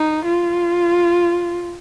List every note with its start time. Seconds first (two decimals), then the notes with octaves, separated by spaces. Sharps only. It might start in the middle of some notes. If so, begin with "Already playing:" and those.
Already playing: D#4
0.25 F4